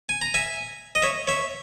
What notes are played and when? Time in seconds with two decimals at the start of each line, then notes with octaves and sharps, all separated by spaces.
0.09 G#5
0.21 A#5
0.34 E5 G#5
0.95 D#5
1.02 C#5 E5
1.27 C#5 E5